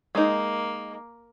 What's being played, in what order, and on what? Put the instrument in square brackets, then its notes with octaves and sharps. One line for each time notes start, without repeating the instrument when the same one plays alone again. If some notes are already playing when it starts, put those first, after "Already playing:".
[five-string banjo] G#3 D#4 [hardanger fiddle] A#3